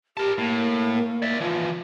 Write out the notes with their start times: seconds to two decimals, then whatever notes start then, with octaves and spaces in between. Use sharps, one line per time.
0.17 G4 A#4 A5
0.38 A2 A#3
1.22 D5 E5
1.41 E3 F3 F4